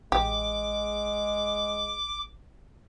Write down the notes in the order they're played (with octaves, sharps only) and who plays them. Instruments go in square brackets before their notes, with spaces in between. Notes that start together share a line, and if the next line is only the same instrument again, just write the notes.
[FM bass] A1 [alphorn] G#3 [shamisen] G4 [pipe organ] D6